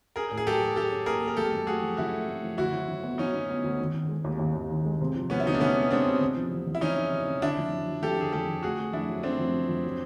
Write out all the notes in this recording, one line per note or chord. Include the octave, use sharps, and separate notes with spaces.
C#4 G#4 A#4
A2
G#4
F#3 G4 A4
F#3
F#3 G4 A4
C#4
A#3 G#4 A#4
A#3
A#4
F#2 G4 A4
F#2
A3 F#4 G#4
F3
C#3 E4 F#4
A3
A3
F3
D2 E4 F#4
F#3
F#3
B3
F#3 C#4 D#4
B3
B3
D2
D#3
D#3
G#3
D#2
D#2
D#2
D#3
G#3
C3
F3
G#3 B3 C#4
E4
D2 D#4
D4
C3 B3 C#4
G#3
G#3 C4 D4
C3
C#3
F3
E2
E2
E4
E2 C#4 D#4
F3
C#3
C#3
D3 D4 E4
F2
F#3
F#3
F2 G4 A4
D3 G#4
F2 G4 A4
D3
A3 F#4 G#4
A3
F2 D4 E4
F#3
A3 C4 D4
F2
C#3
F2
F#3